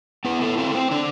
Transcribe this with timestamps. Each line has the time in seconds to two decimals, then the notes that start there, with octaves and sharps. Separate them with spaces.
0.25 B3 E4 B4
0.41 A3 A4
0.58 A3 C4 A4
0.75 C4 C5
0.91 D3 D4 D5